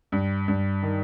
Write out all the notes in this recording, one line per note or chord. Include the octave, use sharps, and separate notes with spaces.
G2
G2
D#3